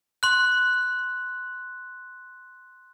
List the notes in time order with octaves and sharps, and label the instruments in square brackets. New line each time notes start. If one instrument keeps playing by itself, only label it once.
[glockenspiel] C6 F#6